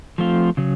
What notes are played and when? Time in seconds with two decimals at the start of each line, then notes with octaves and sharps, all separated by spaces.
0.18 F3 A3 C4 F4
0.57 C#3 F#3